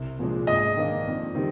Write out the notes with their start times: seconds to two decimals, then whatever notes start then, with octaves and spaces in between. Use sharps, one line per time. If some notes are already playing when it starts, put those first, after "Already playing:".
Already playing: C2
0.19 A#2 F3 G#3 D4
0.47 G#2 D#5
0.77 D#3 A#3 D4
1.06 F2
1.35 D#3 G3 C4 D#4